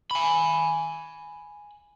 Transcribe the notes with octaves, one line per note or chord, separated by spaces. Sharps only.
G#5 B5